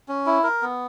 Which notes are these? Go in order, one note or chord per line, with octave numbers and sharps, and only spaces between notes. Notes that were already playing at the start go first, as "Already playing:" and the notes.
C#4
E4
A#4
B3